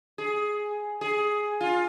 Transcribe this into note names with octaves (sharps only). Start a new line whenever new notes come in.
G#4
G#4
F4